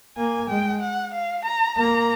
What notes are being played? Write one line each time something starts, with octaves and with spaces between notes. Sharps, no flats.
A#3 G#5
G#3 G5
F#5
F5
A#5
A#3 A#5